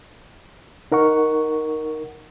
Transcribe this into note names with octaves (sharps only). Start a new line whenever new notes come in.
D#4 A#4 F#5 C#6